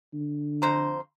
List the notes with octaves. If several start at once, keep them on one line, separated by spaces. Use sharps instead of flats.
D3
F2 C5 A#5